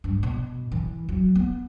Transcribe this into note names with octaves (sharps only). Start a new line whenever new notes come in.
G2
B2
E3
F#3
B3